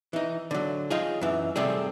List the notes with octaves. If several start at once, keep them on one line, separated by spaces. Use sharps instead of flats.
E3 D#4
D3 F#3
D#4 F4 G#4
F#2 E3
C3 G3 A3 C4 G#4